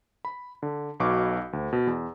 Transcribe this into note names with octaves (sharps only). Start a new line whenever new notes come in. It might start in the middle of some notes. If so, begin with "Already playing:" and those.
B5
D3
B1 B2 C#6 D6
D2
B2
E2